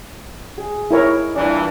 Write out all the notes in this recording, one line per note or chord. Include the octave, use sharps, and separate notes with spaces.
G#4
E4 A#4 C#5 D#5 G#5 B5
G2 A#2 E3 D4